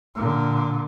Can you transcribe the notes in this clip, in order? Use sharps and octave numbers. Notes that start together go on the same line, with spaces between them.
A#2 D3